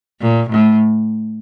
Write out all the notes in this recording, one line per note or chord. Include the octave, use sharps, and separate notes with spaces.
A#2
A2